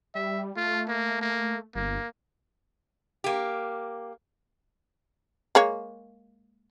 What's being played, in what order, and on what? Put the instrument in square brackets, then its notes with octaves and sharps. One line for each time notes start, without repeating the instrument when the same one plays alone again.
[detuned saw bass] G3 [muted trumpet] E5
[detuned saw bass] A3 [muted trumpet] F4
[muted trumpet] A#3
A#3
[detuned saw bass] G1 [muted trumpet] A#3
[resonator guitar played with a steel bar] A#3 G4
[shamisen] G#3 A#3 C#5